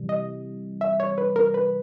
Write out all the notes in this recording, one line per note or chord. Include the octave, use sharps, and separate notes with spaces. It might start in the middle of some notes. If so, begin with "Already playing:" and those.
Already playing: C3 E3 G3
D#5
E5
C#5
B4
A#4
B4